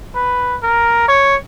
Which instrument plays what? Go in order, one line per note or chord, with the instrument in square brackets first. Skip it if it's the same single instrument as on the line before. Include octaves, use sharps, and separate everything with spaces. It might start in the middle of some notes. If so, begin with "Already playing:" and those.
[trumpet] B4
A#4
C#5